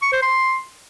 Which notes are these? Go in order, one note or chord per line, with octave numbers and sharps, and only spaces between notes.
C#6
C5
C6